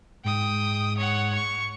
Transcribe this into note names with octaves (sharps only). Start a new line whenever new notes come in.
G#2 G5 D#6
C#5 F#5
C#6